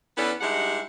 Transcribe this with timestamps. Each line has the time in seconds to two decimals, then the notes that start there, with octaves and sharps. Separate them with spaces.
0.17 E3 B3 C#4 D4 A4 B4
0.41 G2 G#3 D#4 E4 G4 F#5